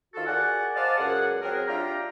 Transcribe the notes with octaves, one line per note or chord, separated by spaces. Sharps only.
D#3 F4 F#4 A4
F#4 G#4 A#4 D5 F#5
C5 D5 D#5 F5 F#5 A5
C#2 F#2 G#4 F#5
F#3 C4 G#4 A#4
D4 F4 G4 E5 G5 A#5